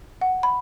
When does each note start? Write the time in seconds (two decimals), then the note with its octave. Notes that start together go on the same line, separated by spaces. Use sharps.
0.21 F#5
0.43 B5